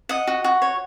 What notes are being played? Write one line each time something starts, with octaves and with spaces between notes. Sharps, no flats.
D#5 F#5
F#4
F#4
C#5